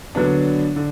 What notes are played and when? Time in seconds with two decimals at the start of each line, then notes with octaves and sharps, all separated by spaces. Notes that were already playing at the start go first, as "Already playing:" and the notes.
0.15 D3 F#3 B3 D4
0.76 D3